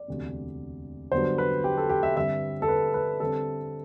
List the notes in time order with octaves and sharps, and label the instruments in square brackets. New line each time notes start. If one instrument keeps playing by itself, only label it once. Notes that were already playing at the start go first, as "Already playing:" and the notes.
Already playing: [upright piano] D5
E1 D2 C3
G2 D3 F#3 B3 D4 C5
B4
G4
A4
G4
E5
G2 D3 G3 C4 E5
A4
B4
B4
D3 G3 C4 A4